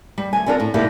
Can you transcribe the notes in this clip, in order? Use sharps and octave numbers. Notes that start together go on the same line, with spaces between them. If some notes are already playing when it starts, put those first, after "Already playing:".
G3
D2 G#5
B3 C4 D4 F4 A#4
A2
G#2 B2 D3 A#3 E4 G4